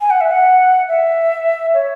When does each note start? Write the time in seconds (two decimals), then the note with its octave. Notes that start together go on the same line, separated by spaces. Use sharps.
0.01 G#5
0.10 F#5
0.21 E5
0.31 F#5
0.88 E5
1.74 C#5